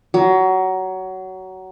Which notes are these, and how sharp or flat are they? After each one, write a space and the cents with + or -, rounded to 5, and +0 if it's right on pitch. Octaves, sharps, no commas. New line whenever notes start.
F#3 +20